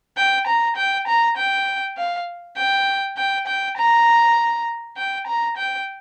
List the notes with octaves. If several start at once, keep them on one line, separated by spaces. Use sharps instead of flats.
G5
A#5
G5
A#5
G5
F5
G5
G5
G5
A#5
G5
A#5
G5